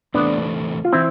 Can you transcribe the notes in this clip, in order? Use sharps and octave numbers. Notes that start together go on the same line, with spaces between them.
E2 C3 E3 A3 B3 C4 D4
F4
E3 C4 E4